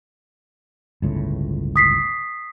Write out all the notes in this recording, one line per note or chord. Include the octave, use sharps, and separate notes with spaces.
G1 C#2 A2
D#6 B6 C7